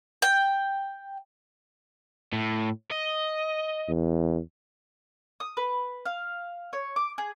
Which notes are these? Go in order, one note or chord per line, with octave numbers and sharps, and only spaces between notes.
G5
A2
D#5
E2
D#6
B4
F5
C#5
D6
G#4